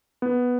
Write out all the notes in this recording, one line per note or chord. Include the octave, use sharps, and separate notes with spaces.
B3